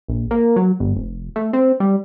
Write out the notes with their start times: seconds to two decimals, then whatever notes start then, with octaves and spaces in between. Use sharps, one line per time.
0.08 A#1
0.31 A#3
0.56 F#3
0.80 G1
0.96 F1
1.36 A3
1.53 C4
1.80 G3